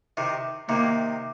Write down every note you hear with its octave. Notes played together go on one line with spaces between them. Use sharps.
C3 D#3
C3 D#3 A#3